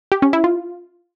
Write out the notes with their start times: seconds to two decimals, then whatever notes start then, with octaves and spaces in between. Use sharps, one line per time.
0.12 G4
0.22 C#4
0.33 E4
0.44 F4